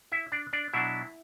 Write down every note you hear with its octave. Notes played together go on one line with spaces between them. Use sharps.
E4 E5
D4 D5
D4 D5
B2 F#3 D4 E4 E5